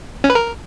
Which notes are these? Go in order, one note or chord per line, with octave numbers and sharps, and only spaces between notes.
C#4
B4
A#4